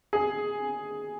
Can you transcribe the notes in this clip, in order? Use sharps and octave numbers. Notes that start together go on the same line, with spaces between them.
G#4